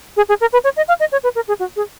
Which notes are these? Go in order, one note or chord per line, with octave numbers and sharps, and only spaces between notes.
G#4
G#4
A#4
B4
C#5
D#5
F5
D#5
C#5
B4
A#4
G#4
F#4
G#4